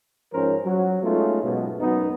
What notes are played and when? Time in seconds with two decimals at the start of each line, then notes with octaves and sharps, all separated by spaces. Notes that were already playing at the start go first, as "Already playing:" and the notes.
0.33 G#2 F3 C#4 A#4 C5
0.65 F#3
1.03 G#3 A3 B3 C#4 D#4 F4
1.43 G#2 B2 F#3
1.80 F#2 B3 D#4